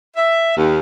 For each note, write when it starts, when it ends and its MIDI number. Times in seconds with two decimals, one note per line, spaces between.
0.16 0.51 76
0.56 0.80 39